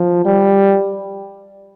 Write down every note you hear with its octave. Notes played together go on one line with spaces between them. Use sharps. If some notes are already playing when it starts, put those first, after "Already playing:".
Already playing: F3
G3